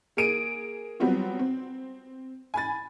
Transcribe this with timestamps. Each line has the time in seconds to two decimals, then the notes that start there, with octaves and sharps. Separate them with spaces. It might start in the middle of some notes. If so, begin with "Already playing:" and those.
0.17 A#3 G#4 D7 D#7
1.00 F#3 G3 B3 C4 F4
1.39 C4
2.54 G#5 B5 A6